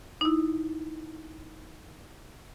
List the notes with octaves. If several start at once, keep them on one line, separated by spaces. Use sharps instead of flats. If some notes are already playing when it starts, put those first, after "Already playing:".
D#4 E4